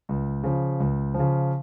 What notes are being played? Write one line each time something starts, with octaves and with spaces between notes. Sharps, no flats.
C#2
C#3 F3
C#2
C#3 F3